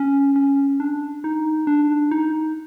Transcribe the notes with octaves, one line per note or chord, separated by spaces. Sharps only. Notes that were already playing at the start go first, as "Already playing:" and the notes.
Already playing: C#4
C#4
D4
D#4
D4
D#4